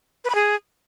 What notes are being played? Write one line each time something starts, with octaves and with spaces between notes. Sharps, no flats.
B4
B5
G#4